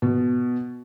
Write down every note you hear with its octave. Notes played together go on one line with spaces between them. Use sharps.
B2